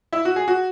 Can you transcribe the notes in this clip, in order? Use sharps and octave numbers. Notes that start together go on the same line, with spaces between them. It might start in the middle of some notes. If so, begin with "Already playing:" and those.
E4
F#4
G#4
F#4